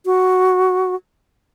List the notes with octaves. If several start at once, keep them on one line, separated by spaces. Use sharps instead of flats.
F#4